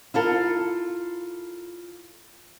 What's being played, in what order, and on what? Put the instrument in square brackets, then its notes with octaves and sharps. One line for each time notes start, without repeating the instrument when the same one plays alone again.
[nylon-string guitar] E4 F4 A4 A#4